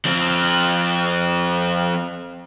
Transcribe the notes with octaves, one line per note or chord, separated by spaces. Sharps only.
F3 C4